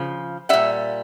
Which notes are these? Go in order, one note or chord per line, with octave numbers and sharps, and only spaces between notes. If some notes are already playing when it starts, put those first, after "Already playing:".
Already playing: C#3 F3
A#2 G3 E5 F#5